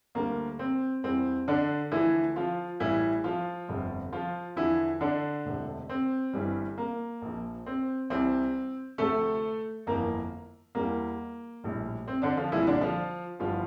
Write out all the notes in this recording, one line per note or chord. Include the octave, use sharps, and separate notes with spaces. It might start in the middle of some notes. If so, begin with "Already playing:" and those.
D2 D3 G3 A#3
C4
E2 E3 G3 C4
D3 D4
D2 D3 E3 F3 E4
F3 F4
A1 A2 E3 G3 E4
F3 F4
G1 F2 C3 G3
F3 F4
E2 D3 E3 F3 E4
D3 D4
E1 D2 C3
C4
G1 G2 E3 G3
A#3
A#1 A#2 F3
C4
C2 C3 E3 G3 C4
D2 C3 F3 A3 A4
G1 F2 E3 A#3 A#4
E2 E3 G3 A#3
A#1 A2 G3
C4
D3 D4
F3 F4
C2 A#2 E3 G3 E4
D3 D4
F3 F4
G1 G2 E3 F3 G3 F4